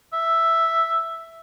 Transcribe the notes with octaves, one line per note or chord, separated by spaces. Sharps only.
E5